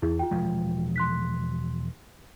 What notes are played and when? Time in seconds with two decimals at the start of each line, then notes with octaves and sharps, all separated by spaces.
0.02 E2 E4 G#4
0.19 F4 G5
0.31 E1 F3 G#3
0.96 C6 F#6 B6